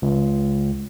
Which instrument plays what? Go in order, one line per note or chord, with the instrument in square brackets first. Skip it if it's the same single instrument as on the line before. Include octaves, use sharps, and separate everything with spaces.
[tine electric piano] C#2